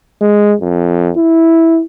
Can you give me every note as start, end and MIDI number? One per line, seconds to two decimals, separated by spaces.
0.21 0.55 56
0.61 1.11 41
1.17 1.83 64